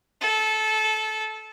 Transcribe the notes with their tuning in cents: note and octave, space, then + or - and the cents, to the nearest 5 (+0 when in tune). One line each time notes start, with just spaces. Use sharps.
A4 -20